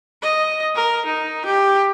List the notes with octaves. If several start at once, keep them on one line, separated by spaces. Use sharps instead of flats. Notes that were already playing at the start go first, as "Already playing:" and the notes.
D#5
A#4
D#4
G4